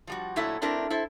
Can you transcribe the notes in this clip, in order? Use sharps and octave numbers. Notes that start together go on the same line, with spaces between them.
F3 G3 F#4
A#2 F#3 A3 E4 E5
A3 C4 D4 E4 A#4
E4 A4 C5